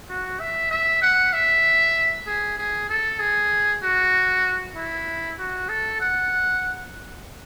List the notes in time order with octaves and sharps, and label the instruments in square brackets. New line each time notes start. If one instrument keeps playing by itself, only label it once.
[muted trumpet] F#4
E5
E5
F#5
E5
G#4
G#4
A4
G#4
F#4
E4
F#4
A4
F#5